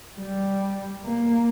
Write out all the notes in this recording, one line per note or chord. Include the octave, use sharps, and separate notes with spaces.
G3
A#3